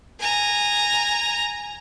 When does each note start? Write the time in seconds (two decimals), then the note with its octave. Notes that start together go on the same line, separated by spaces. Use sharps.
0.19 G#5 A#5